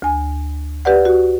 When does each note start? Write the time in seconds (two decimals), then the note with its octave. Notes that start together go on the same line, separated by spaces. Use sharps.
0.02 D2 G#5
0.85 G4 B4 D5 F#5
1.05 F#4